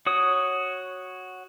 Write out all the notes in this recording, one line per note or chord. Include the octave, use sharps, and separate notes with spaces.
F#4 C#5 D#6